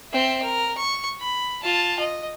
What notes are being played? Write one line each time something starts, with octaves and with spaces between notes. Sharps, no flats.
C4 E5
A#4
C#6
B5
F4 A5
D#5